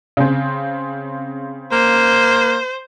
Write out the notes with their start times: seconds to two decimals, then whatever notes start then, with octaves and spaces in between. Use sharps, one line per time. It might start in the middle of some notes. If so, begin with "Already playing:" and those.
0.17 C#3 C4
1.72 A#3 C5